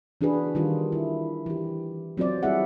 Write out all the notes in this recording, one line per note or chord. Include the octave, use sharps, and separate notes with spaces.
E3 D4 F#4 G#4 B4
D#3 G3 F4 G4
E4
E3 G4
F#3 C4 F4 C5 D5
G3 C4 E4 G#4 E5 F#5